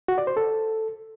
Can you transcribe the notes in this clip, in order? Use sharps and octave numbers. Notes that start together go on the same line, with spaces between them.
F#4
D5
C5
A4